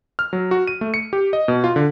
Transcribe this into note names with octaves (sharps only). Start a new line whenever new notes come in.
F6
F#3
F#4
D#7
A3
C#7
G4
D#5
B2
F4
D3